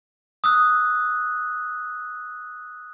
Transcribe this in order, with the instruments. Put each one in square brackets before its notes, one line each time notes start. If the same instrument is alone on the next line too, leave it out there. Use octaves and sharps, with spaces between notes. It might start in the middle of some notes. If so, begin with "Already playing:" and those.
[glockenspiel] D#6 E6 F#6